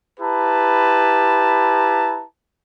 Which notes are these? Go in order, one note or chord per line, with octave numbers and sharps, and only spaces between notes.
E4 G4 B4 A5 A#5